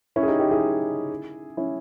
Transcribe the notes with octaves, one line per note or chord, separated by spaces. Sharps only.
C#4 E4
G#4
D#4 G4
D#4 G4
E4 G#4
C#4 E4